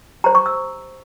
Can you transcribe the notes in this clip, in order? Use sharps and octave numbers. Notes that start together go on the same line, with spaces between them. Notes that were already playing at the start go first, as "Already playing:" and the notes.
G4 C5 A#5
C#6
E6